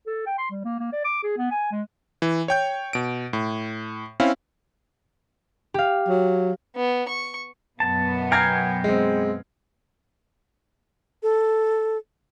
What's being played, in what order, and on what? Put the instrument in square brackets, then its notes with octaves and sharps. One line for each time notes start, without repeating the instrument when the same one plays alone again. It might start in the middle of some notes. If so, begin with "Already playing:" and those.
[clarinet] A4
G5
C6
G3
A#3
A#3
D5
D6
G#4
B3
G#5
G#3
[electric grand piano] E3
C#5 G5 G6
B2 D7
A2
C4 C#4 E4 F5
[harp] G4 F5
[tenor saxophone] F#3
[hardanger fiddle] B3
C#6
[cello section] F#2 B2 B3 [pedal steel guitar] A5
[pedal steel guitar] G5 G#5 A#5 [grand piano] F6 G#6 C7
[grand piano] G#3 C4
[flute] A4